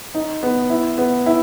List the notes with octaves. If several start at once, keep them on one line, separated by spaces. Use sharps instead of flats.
D#4
B3
E4
B3
E4